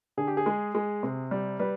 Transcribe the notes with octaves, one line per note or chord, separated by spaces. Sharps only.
D3 G#4
G4
G#4
G#3
G#3
C3
G3
G3 B4